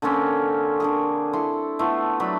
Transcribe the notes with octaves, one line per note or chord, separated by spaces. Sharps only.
D3 A#3 C4 C#4
D3 A#3 G#4
E4 A4 C6
A3 B3 E4 F4
F#3 D4 B5